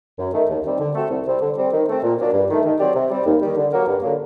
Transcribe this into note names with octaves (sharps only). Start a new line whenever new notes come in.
F#2
D#3 A3
D#2
D#3 G3 C4
D3
A3 C4 F#4 A4
C2
C3 G3 C4
D3
G3 C4
D#3
A3 C4
A#2
F#3 A#3 D4
G2
D#3 A3
D#3
F#3 C4 G4 D5
C3
G3 C4
D#2
D#3 G3
D3
F#3 A#3 F#4 A#4
G2
D3 F#3 A#3